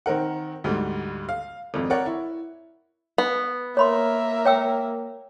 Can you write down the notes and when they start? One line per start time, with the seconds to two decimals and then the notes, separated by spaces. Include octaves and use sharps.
0.06 D#3 C4 A#4 F#5
0.64 D2 G#2 G3
1.29 F5
1.74 G#1 F2
1.90 A#4 C#5 D5 F#5
2.06 E4
3.18 B3
3.77 A#3 A#4 C#5 E5 B5 C6
4.45 C#5 G5 E6